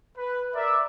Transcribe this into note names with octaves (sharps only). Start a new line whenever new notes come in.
B4
A#4 D5 E5